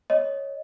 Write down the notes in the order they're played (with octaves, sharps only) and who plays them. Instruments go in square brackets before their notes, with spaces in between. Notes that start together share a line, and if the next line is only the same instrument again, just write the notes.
[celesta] C#5 D#5